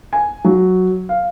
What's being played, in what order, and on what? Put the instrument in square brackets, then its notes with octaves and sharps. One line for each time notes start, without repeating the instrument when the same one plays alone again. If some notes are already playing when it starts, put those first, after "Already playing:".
[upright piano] G#5
F#3
F5